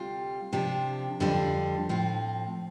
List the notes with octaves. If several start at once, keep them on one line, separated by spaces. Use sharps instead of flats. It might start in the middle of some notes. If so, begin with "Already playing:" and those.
Already playing: D2 C3 G3 F4
C3 F3 D4 G4
F2 D3 G3 D4 F4
A2 F3 C4